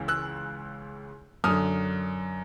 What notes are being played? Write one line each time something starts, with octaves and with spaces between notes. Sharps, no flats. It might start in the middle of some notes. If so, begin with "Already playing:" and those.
Already playing: C#2 C#3 E3
E6 F#6
F#2 D3 D#6 F6